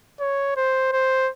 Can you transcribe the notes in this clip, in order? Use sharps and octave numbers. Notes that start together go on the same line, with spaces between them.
C#5
C5
C5